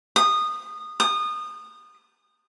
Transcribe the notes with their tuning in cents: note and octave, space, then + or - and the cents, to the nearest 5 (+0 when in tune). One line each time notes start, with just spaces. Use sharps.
D#6 -20
D#6 -25